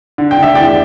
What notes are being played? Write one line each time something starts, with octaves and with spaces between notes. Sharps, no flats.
D3
G5
D3 E5
E2 D5 G5